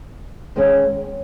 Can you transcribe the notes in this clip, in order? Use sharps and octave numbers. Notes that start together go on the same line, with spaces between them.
G#2 D#3 G#3 C#4